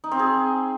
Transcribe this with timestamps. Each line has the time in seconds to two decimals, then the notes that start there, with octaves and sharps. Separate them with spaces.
0.04 D#4
0.12 C4
0.19 G#4